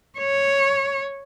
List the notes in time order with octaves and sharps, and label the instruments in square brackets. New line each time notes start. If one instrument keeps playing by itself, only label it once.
[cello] C#5